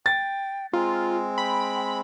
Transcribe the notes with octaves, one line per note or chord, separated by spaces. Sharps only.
G5 A6
G#3 C4 F4 A#5
G5 B5